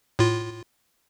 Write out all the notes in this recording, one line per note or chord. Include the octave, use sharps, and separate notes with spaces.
A2 F4